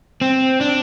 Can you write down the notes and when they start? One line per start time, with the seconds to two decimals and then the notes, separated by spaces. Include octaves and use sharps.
0.21 C4
0.61 D4